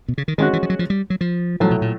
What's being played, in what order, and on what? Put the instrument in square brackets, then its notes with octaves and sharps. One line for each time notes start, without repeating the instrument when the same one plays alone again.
[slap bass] B2
C#3
D#3
[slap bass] D#3 [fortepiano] G#3 C#4 F#4
[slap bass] E3
F3
F#3
F3
G3
F#3
F3
[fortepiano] A2 F#3 A3 [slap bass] F3
[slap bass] B2
A#2